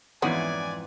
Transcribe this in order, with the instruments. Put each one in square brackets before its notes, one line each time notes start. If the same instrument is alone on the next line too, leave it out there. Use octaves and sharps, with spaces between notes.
[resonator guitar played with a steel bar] F2 G#2 E3 [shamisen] B3 C#4 F#4 [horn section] D5 G#5